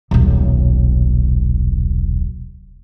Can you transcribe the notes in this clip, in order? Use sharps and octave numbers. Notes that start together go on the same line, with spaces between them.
D#1 B1